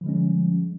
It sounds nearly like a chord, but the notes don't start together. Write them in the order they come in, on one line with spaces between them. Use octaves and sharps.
F3 D3 G#3 C#4 G3